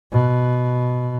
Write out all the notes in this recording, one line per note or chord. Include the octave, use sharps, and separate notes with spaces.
B2